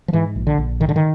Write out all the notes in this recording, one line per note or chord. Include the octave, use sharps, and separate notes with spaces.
F3
G#2 E3
A#1
D3
A#1
G#2 D#3
D3
D#3